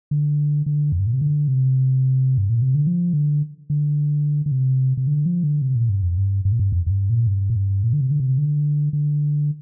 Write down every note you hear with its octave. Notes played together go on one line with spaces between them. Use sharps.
D3
D3
F2
G2
A#2
C3
D3
C3
G2
A#2
C3
D3
F3
D3
D3
D3
C3
C3
D3
F3
D3
C3
A#2
G2
F2
G2
G2
A#2
G2
F2
F2
G2
A#2
G2
A#2
G2
A#2
D3
C3
D3
C3
D3
D3